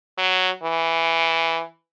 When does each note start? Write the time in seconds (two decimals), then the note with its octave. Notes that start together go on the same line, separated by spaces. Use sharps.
0.18 F#3
0.63 E3